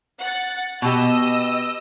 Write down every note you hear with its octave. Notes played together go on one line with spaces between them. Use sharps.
F#5 A6
B2 G4 D#5 E6